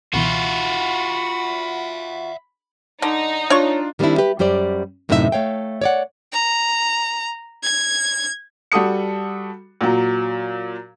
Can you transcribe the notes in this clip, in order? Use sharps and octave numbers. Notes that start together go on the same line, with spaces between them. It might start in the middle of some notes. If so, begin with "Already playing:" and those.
C#2 B2 E3 F4 F#4 E5 F#5 B5
D3 D#4
D4 F4 C#5 C#6
D#3 G3 B3 C4 D4 E4
G4 B4
F#2 G3 G4 C5 D5
F#2 A2 C3 D#4 A#4 E5
A3 C#5 F5 G5
C#5 D5 F#5
A#5
G#6
G3 F#4 A4 D#6 C#7
A#2 F#3